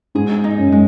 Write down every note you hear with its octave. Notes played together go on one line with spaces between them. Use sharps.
G#2 G#4
D#4
F#2
G#3